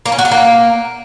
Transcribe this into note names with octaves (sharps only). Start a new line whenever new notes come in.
A#3
C#4
F#4
D4
A#3